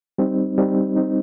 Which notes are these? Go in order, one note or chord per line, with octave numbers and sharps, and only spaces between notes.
G3 C4 D#4
G3 C4 D#4
G3 C4 D#4